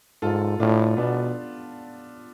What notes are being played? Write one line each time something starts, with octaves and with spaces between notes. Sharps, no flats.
G#2 F4 A4
A2 D4 F4
B2 B3 D4